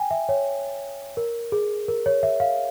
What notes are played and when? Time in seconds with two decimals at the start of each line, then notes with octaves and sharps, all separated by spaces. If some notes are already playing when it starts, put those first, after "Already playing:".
Already playing: G5 G#5
0.11 E5
0.29 C#5
1.17 A#4
1.52 G#4
1.88 A#4
2.06 C#5
2.23 E5
2.40 F5